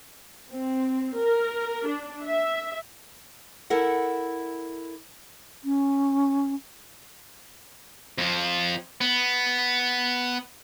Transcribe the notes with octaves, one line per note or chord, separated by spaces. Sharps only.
C4
A#4
D4
E5
E4 A4 A#4 F#5
C#4
F2 F3
B3